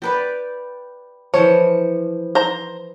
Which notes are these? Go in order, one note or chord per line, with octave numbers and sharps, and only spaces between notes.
G4 B4 D5
E3 F3 C#5
C5 A#5